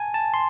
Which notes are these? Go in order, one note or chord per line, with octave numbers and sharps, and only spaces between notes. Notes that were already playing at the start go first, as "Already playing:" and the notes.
Already playing: G#5 A5
A5
C6